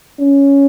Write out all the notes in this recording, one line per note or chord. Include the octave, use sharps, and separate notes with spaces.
C#4